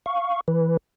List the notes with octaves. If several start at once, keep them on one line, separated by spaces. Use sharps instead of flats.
F5 C#6
E3 B4